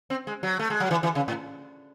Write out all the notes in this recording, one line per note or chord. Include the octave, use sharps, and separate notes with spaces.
C4
G#3
F#3
A3
G#3
F#3
E3
E3
C#3
A2